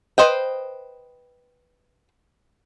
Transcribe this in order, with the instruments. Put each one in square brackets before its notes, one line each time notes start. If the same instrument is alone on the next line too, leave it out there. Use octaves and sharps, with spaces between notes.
[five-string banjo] B4 C5 D#5 G5